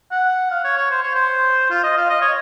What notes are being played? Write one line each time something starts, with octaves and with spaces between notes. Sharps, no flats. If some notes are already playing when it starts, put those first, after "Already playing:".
F#5
F5
C#5
C#5
C5
C#5
C5
F4
D#5
F5
D#5
C#5